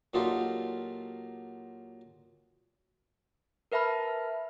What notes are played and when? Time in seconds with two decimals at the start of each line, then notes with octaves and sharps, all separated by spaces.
0.14 A#2 F#3 D#4 F4 G4 A4
3.72 A#4 B4 E5 A5 B5 F6